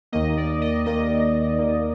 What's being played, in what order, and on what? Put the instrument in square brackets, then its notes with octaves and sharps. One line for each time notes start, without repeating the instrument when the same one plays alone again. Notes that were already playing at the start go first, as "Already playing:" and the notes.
[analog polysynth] D#2 D#3 A#3 D#5
D5
D#5
D#2 D#3 A#3 D#5
D#2 D#3 A#3